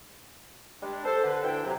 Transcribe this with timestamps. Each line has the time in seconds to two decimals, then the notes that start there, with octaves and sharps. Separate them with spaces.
0.82 G3 G#3 D4
1.05 A4 C5
1.24 D3 B4
1.44 D2 E3 D4 E4 G5
1.65 C3 F#3